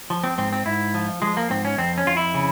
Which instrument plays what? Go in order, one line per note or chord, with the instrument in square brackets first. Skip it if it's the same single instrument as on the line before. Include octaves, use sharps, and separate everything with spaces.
[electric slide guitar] F3
C4
G#2 C4
C4
G#2 E4
F3
F3 G#3
A#3
G#2 C4
C#4
F2 C4
C#4
F2 F4
E4
C#3